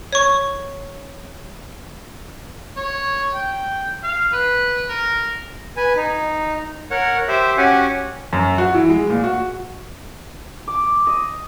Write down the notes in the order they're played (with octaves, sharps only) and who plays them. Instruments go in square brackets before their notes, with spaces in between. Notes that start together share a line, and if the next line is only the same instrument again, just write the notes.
[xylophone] C#5 C#6
[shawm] C#5
G5
F5
B4
A#4
[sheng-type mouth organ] B4 G#5
D#4
A#4 C#5 F#5
G4 C5 E5
C#4 F#4 G4 F#5 G#5
[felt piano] F#2
F#4
E3
G#3
A#2
F#4
[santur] D6
D#5